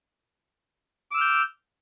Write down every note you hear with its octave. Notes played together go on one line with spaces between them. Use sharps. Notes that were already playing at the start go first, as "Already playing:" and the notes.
D6 E6 F6 G6